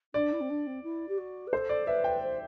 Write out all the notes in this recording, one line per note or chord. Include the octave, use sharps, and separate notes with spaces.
D4 D5
E4
C4
D4
C4
E4
G4
F#4
B4
A4 C5
D5
B4 E5
G5
C5